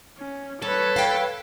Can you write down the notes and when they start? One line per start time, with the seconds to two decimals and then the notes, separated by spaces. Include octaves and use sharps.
0.18 C#4
0.62 G3 A4 B4 C#5
0.96 F5 G5